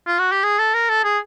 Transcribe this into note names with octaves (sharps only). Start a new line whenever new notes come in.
F4
F#4
G4
G#4
A4
A#4
A4
G#4